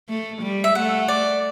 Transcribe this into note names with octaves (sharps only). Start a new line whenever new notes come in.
A3
G3
E5
A3 F#5
D5